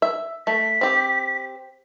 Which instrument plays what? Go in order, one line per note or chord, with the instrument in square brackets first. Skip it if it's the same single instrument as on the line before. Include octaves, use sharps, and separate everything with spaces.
[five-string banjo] E5
[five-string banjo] A3 [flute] B6
[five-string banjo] C4 G4